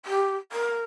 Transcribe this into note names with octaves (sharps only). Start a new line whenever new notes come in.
G4
A#4